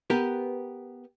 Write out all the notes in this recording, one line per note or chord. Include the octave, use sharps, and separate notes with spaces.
B3 G4 A#4 B4